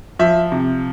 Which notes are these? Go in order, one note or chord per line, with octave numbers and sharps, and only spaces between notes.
F3 E5
C3